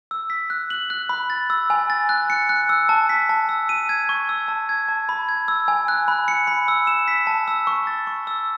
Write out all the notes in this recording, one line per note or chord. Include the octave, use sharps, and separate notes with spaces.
E6
B6
F#6
F#7
F#6
B5
A6
E6
G#5
A6
F#6
C#7
F#6
E6
A5
B6
A5
E6
D#7
G#6
C#6
E6
A5
G#6
A5
B5
G#6
E6
G#5
F#6
B5
C#7
B5
E6
E7
B6
A5
E6
C#6
A6
C#6
E6